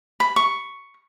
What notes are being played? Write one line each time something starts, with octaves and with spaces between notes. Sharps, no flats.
B5
C#6